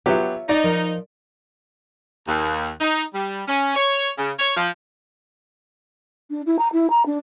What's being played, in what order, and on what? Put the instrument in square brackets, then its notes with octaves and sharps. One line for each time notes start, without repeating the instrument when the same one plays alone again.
[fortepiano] F#3 B3 G4 [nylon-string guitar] F4 C#5 E5
[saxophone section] D#4 [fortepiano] D5
[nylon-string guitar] F3 A#4
[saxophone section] D#2
D#4
G3
C#4
C#5
C#3
C#5
F3
[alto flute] D4
E4
A#5
E4
A#5
D4